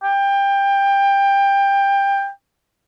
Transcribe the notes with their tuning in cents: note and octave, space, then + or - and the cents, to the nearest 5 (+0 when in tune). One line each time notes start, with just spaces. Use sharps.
G5 +20